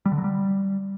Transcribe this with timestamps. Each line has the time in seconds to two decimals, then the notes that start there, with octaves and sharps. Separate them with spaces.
0.06 G3
0.12 D3
0.18 F#3
0.24 G3